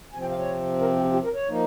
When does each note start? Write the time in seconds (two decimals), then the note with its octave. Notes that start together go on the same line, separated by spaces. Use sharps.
0.13 C3 F3 C4 G#5
0.21 G5
0.31 F5
0.39 C#5
0.80 A#4
0.97 G4
1.04 F4
1.13 G4
1.24 A#4
1.35 C#5
1.48 F3 A#3 D#4